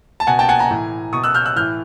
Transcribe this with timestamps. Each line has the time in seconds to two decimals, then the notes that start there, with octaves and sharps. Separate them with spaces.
0.20 A5
0.27 B2 F#5 G#5
0.39 G5 A5
0.49 F#5 G#5
0.59 G#5 A#5
0.71 A2 E3
1.13 B2 C#6 D#6
1.24 E6 F#6
1.35 F6 G6
1.46 E6 F#6
1.56 A2 E3 F6 G6